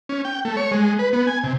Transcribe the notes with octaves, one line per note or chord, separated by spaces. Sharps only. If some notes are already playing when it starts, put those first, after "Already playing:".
C#4
G5
A3
C#5
G#3
B4
B3
G#5
C3